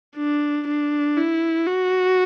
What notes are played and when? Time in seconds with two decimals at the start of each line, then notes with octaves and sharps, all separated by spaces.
0.17 D4
0.68 D4
1.17 E4
1.67 F#4